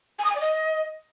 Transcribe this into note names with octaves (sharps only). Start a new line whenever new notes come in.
G#5
D#6
G#5
D5
D#5